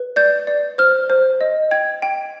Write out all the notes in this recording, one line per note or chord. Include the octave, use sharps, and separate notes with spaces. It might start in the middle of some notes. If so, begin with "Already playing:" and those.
Already playing: B4
D5 G6
D5
C5 F6
C5
D#5
G5 G#6
G5